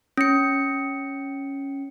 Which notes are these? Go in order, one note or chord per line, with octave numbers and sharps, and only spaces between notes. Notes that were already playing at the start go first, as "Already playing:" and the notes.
C#4 C#7